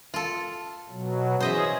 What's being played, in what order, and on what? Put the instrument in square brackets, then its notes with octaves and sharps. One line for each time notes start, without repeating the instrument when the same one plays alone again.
[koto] F4 A4
[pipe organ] B2 F#3
[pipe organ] E3 C#4 G#4 [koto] C5 D#5 E5